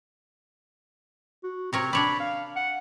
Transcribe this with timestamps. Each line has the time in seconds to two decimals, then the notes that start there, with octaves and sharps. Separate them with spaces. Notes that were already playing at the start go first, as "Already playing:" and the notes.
1.43 F#4
1.73 C3 C4 A#4 C#5
1.93 D4 C#5 D5 B5
2.20 F5
2.56 F#5